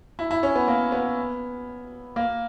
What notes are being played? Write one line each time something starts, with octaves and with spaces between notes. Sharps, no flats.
E4
E4
C#4
B3
A#3
B3
A#3